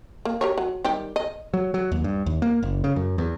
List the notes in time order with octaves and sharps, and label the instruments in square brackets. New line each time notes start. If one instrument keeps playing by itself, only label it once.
[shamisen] A#3
G4 A#4 C#5
F#3
D#3 G3 G4
D#5
[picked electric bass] F#3
F#3
D#2
G2
D#2
A#3
F#1
C#3
F#2
E2